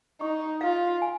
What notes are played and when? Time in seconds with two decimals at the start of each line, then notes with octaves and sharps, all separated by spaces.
0.21 D#4 C#6
0.61 F4 F5
1.02 G#5